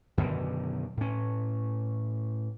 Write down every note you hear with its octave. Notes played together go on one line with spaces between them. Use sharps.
F#2 B2 D3 D#3
A2 C#4